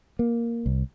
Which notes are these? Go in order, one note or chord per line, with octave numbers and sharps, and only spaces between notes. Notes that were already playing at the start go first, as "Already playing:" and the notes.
A#3
C2